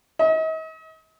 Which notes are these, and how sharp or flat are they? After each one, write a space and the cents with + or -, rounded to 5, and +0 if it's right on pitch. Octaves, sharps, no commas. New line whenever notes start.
D#5 +40